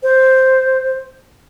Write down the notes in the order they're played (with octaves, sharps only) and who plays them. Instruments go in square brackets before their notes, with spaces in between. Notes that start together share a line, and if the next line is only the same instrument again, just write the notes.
[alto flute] C5